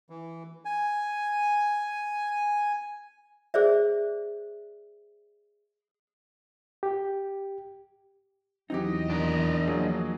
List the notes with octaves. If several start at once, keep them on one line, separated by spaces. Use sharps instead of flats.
E3
G#5
G#4 C5 D5 E5
G4
E2 E3 F#3 C4 D#4 G4 D#5
D#2 D4 A#4
F3 F#3 A#3 G#4